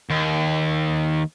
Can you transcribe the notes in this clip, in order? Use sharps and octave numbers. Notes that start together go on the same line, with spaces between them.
D#2